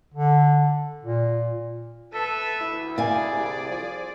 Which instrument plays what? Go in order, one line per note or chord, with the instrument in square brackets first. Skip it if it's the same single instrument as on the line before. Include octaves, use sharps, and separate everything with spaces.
[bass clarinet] D3
A#2
[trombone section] A4 [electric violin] B4 E5
[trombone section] D2 [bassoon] E4
[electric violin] G#4 D5 [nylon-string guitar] F5 G#5
[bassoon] C2
F3